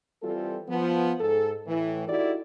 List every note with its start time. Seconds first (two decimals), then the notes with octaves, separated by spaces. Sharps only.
0.22 E3 G3 C4 F4 A4
0.68 F3 B3
1.20 G#2 A4
1.66 A2 E3
2.07 D#4 E4 F#4 G4 A4 D5